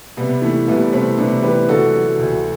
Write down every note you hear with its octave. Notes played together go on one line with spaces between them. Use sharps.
C3 G3 B3
E3 A3
C2 G3 B3
C2 A3 C4
C3 B3 D4
E3 G4 B4
D3 F#4 A4
F#3
D2